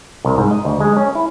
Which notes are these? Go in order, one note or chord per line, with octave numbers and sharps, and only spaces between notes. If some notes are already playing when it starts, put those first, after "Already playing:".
C2
G#2
D#5
D2
G#3
C#4
E4